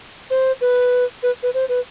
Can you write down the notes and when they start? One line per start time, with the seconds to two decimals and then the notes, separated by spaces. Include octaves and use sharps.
0.30 C5
0.61 B4
1.23 B4
1.43 B4
1.54 C5
1.69 B4